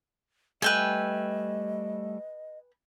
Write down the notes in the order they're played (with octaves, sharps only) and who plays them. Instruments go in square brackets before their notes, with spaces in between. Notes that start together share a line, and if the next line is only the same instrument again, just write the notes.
[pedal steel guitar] G3 A3 E5 [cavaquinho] B4 G5 G#5 [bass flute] D#5